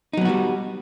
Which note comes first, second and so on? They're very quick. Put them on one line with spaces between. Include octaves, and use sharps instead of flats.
D#4 F#3 B3 F#4 G3